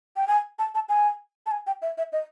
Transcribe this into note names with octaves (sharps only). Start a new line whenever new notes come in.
G5
G#5
A5
A5
G#5
A5
G#5
G5
E5
E5
D#5